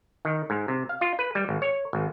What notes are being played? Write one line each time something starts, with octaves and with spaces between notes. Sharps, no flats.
D#3
G#2
C3
F5
F4
B4
G3
G#1
C#5
G#1